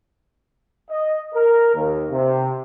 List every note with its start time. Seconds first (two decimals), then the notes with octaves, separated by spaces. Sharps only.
0.90 D#5
1.35 A#4
1.75 D#2
2.11 C3